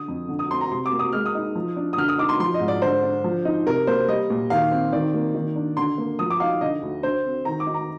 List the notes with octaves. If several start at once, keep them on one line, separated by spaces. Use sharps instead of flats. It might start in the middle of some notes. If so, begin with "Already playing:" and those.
Already playing: D3 D#6
F2
D3
D#6
C4 C6
A#5
C3 C6
D6
A#3
D#6
G#3 F6
D#6
D#4
F3
D4
D#6
D3 F6
D#6
D#4 D6
C6
F3 C6
D#5
G#2
D5
D3 C5
D4
F3
D#4
C3 A#4
A#3 C5
G3 D#5
A#2
D#3 F5
C4
D#3 D5
A#3
D#3
D4
D3 C6
A#3
F3 D#6
D6
D#4 F5
D3 D#5
D2
D3 C5
C4
D#3 A#5
D6
D#4
A#5